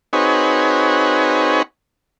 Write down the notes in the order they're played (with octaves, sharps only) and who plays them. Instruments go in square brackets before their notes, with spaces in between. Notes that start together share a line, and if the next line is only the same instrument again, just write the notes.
[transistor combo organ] C4 D#4 F#4 G#4 B4 C#5